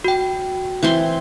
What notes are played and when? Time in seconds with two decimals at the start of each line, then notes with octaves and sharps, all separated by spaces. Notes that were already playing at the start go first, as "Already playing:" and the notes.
0.04 F#4 G5
0.83 E3 C4 C6